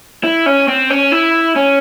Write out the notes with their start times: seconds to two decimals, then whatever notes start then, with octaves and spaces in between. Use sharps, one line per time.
0.24 E4
0.46 C#4
0.68 C4
0.90 C#4
1.12 E4
1.56 C#4